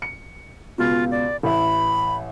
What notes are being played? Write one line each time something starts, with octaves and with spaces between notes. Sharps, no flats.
C#7
C#2 B2 F4
D5
A1 E5 B5